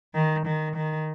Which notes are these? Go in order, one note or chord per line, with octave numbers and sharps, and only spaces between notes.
D#3
D#3
D#3